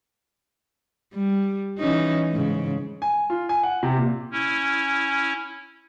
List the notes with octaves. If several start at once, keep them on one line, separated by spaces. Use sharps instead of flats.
G3
E3 C#4 D#4
G#2 C#3
G#5
F4
G#5
F#5
C3
A#2
C#4 E4